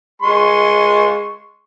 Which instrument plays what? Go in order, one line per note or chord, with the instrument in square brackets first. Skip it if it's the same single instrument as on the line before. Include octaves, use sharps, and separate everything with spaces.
[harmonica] G#3 C6 C#6